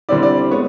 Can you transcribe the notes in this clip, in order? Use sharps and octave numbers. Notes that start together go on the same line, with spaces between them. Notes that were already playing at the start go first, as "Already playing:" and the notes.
D3 G3 C4 E4 D5
D5
G#3 B3 C#5